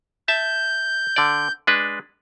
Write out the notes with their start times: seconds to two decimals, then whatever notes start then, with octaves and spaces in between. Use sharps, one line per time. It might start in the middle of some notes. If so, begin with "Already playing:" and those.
0.28 E5 A5 G6
1.16 D3 D5
1.67 G#3 D4 B4